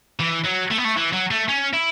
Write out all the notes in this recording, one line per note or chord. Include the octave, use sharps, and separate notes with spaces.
E3
F#3
A3
B3
A3
E3
F#3
A3
C#4
E4